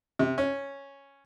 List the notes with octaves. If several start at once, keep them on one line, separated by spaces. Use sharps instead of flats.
C3
C#4